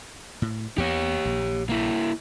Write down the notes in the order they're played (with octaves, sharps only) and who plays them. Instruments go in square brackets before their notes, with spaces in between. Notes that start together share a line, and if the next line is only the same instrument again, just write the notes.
[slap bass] A2
[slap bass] E2 B3 [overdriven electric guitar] G4 C#5
[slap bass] A#1
[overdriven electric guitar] A#3 E4